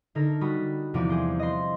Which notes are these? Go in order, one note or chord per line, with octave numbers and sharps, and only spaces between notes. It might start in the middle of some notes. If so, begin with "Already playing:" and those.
D3 D#4 A4 A#4
G3 F#4 B5 D#6
E2 C3 F3 D5 D6
G#4 C5
D#5 C6